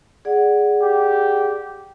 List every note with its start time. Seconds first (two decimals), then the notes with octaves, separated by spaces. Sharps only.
0.25 G#4 D5 F#5
0.82 G4